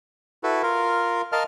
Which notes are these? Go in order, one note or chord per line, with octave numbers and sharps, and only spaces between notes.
E4 F#4 A4 B4
F4 A#4 F5
A#4 D#5 F5 A5 F6